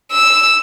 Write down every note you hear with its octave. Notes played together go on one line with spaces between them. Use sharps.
E6